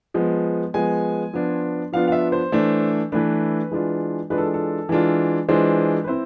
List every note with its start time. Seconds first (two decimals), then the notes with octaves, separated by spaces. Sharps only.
0.14 F3 G#3 B3
0.74 F3 G#3 B3 G#5
1.33 F3 B3 D4 F4
1.92 F3 B3 D4 F4 F5
2.08 F5
2.12 E5
2.32 C5
2.52 E3 A3 D4
3.12 E3 A3 D4 B4
3.71 E3 G#3 D4 F4
4.30 E3 G#3 D4 F4 B4
4.38 A4
4.54 A4
4.89 E3 G#3 D4 F4
5.49 E3 G#3 D4 F4 C5
6.04 B4
6.08 C4 E4 C5